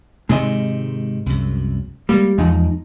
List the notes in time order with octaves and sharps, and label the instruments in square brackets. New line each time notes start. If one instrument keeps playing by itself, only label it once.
[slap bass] G#2 C3 D#3 [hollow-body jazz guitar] G#3 C4 D#5
[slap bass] C2 F#2
[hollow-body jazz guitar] G3 [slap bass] G#3 A#3
[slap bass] E2 [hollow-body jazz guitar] G#2 F3 D#4